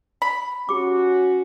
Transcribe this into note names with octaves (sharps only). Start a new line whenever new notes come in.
B5
C#4 F#4 G4 D6